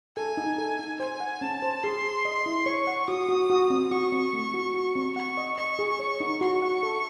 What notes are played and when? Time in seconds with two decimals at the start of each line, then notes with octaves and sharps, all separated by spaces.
0.16 A4 G#5
0.37 D#4
0.58 A4
0.79 D#4
0.99 C5 G#5
1.20 F#5
1.41 C#4 A5
1.62 C5
1.84 G#4 C6
2.04 G#4
2.25 D#5
2.46 E4
2.66 C#5 C#6
2.87 F#5
3.08 F#4 D#6
3.29 F#4
3.50 F#4
3.70 C4
3.91 F#4 C#6
4.12 C4
4.33 A3
4.54 F#4
4.74 F#4
4.95 C4
5.16 F#5 C#6
5.37 D#5
5.57 D#5 C#6
5.79 G#4
5.99 C#5
6.20 D#4
6.41 F#4 C#6
6.62 F#5
6.83 A4